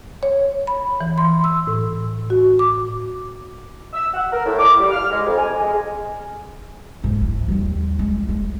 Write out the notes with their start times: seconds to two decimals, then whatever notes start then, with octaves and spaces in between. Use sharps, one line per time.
0.23 C#5
0.67 B5
1.01 E3
1.18 C6
1.44 E6
1.67 A2
2.30 F#4
2.59 D6
3.93 E6
4.14 F#5
4.32 A#4
4.46 A2
4.59 D6
4.79 G3
4.90 F6
5.11 G#3
5.26 F2
5.38 G#5
5.62 G#3
7.04 G#2
7.21 E3
7.48 D#2 G3
7.99 G#3
8.29 G#3